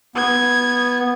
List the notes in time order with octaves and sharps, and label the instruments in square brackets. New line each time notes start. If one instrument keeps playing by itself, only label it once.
[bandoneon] B3 [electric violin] G#6